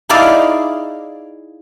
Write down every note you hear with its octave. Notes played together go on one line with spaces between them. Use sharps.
D#4 E4 G#4 D5 F5